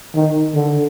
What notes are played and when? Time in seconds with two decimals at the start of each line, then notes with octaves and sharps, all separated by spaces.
0.15 D#3
0.54 D3